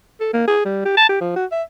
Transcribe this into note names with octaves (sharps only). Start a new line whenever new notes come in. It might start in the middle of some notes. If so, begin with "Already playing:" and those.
A4
A#3
G#4
G3
G4
A5
G4
F3
F#4
E5